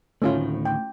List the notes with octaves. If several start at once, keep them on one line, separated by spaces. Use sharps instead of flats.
D2 A2 D#3 A3 C#4 F4
G5